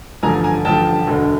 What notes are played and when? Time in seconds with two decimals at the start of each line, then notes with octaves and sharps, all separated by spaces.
0.23 A1 G2 D3 F3 G#5 A#5
0.44 G#5 A#5
0.65 A1 G2 D3 F3 G5 A5
1.07 E1 D2 D3